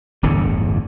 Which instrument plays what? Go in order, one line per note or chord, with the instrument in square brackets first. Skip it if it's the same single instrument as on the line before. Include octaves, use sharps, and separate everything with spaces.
[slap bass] D1 G1 E2 D3